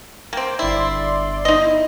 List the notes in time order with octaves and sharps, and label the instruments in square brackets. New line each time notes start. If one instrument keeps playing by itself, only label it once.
[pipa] A#3 C4 [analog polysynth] G5
[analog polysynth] G1 D5 C6 [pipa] E4
[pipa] D#4 D#5
[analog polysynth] E4